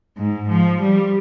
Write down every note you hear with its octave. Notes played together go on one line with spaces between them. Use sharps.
G#2
F3
G3